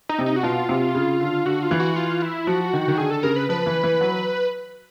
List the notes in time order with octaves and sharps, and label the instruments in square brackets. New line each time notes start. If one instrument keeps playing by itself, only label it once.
[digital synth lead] D#4
[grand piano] C3
[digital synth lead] D#4
F#4
[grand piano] B2 [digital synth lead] F4
[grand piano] C3
C#3
D3
[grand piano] D3 [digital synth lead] F#4
[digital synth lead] F4
[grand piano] E3
[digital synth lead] F#4
F4
E4
[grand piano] F3 [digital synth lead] F#4
[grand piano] D#3
D#3
[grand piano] D3 [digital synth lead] G#4
[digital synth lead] A4
[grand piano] C#3 [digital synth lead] A#4
[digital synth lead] B4
[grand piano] F3 [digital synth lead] B4
[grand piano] E3
E3
F#3